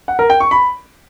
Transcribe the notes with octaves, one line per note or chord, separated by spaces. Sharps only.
F#5
A#4
G5
C#6
B5